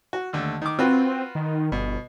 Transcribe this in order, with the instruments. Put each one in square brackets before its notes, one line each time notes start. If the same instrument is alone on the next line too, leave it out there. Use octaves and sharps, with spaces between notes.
[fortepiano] F#4
D#2 D3 A3
D#3 D6
[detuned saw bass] C4 [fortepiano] F4 F#4 B4
[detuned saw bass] D#3
[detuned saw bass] G1 [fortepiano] B2